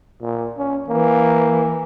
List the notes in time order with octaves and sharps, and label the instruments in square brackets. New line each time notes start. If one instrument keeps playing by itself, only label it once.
[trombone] A#2
C#4
[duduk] E3 [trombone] A#3